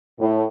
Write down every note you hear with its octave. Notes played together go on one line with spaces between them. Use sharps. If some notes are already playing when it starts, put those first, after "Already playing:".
A2